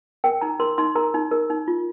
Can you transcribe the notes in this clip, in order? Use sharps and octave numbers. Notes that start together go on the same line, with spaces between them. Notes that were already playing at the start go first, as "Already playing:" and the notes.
A#4 G5
D#4 A#5
A#4 C6
D#4 C6
A#4 A#5
D#4
A#4
D#4
F4